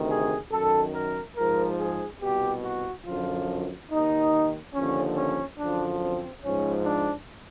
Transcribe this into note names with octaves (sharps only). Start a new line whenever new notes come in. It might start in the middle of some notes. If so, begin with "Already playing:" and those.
Already playing: D2 C3 D#3
G#4
F#2 D#3 A4
A#4
G#2 F3 A#4
G#4
C2 B2 G4
F#4
F#2 D3 F3 F4
D#2 D#3 D#4
D#2 D3 F3 C#4
C#4
F#2 D3 F3 D4
C4
G#2 F3 C#4
D4